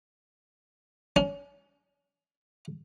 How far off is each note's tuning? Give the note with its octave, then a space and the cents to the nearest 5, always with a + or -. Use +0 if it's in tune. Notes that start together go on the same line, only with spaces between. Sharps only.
C#4 +35